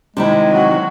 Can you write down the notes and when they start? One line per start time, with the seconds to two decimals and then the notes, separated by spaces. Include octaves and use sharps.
0.17 C3 D#3 G#3 E4
0.51 F#3 F#4